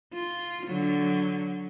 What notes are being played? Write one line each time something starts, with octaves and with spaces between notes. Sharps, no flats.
F4
D3 F#3